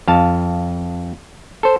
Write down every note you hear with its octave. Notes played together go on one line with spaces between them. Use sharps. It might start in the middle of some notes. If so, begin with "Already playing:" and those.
F2 F5 A5
A4 C5